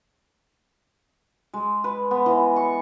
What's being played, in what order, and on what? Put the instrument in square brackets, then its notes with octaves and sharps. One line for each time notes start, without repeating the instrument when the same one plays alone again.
[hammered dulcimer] G#3
B4
B3
E3
C#6